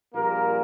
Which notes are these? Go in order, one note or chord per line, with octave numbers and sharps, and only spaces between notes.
A#1 A#2 G3 A#3 A#4